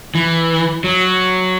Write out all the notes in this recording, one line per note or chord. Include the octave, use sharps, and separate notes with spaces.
E3
F#3